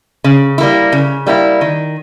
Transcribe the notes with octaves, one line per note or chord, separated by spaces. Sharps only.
C#3
G3 A#3 E4
C#3
G3 A#3 E4
D#3